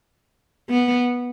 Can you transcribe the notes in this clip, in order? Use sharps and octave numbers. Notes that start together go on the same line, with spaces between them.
B3